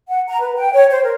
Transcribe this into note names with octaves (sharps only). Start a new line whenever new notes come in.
F#5
A#5
B4
G5
C#5
C5
A#4